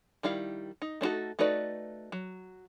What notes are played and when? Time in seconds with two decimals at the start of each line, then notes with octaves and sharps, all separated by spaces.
0.23 D#3 G3 E4 F5
0.82 D#4
1.01 A3 D4 D#4 F#4 A4
1.39 A3 D#4 F#4 B4 D5
2.12 F#3